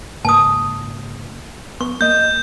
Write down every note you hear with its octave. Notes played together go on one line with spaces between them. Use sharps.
G#2 C#3 A#3 A5 D#6
B3 C#6
A#3 D#5 G6